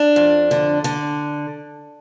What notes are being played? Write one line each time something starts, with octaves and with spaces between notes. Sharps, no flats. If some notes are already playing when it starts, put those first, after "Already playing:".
Already playing: D4
F2
D3
D3